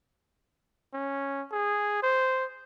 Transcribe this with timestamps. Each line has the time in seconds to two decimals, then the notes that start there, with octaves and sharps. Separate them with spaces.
0.94 C#4
1.52 G#4
2.03 C5